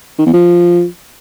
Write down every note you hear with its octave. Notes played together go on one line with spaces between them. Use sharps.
D#3
E2
F3